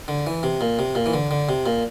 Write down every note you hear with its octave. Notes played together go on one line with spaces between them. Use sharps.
D3
E3
C3
A#2
C3
A#2
E3
D3
D3
C3
A#2